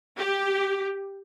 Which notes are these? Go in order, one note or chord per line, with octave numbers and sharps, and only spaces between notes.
G4